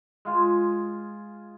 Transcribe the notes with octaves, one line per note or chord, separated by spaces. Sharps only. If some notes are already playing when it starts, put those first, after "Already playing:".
G#3 F4 G#4